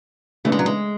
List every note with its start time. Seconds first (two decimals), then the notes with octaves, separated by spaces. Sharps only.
0.45 C#3 E3 A3 B3 D4
0.52 G#3
0.59 F#3
0.66 G#3